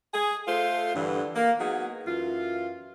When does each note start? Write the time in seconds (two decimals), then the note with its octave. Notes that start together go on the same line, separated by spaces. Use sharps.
0.13 G#4
0.47 A3 F4 A4 C5
0.94 G2 D3 E3
1.35 A#3
1.59 F#3 B3 D#4 G#4
2.06 F#2 E3 F4